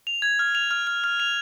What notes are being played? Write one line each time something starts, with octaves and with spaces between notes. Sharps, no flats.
F7
G#6
F6
F7
F6
F6
F6
F7